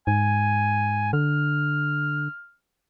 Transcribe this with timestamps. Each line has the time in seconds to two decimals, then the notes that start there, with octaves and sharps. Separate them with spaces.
0.07 G#2 G#5
1.13 D3 F6